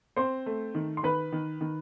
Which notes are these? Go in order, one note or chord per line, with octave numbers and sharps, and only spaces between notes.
C4 C5 C6
A3
D#3
C6
D#3 B4 B5
D#3
D#3